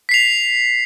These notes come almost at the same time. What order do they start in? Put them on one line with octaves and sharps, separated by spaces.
B6 C7 F7